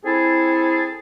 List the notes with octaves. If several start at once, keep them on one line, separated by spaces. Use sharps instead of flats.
C4 E4 G#4 A4